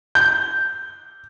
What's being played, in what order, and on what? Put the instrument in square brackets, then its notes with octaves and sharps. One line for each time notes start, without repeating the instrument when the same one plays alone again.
[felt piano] G6